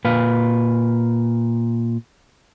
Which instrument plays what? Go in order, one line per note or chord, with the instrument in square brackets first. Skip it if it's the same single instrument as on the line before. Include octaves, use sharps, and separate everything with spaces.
[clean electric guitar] A#2 B4 F5